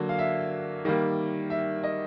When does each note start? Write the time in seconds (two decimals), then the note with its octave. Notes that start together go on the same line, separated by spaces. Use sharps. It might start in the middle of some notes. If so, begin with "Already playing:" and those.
Already playing: D3 F#3 A#3
0.09 F5
0.19 E5
0.85 D#3 G3 A#3
1.50 E5
1.83 D#5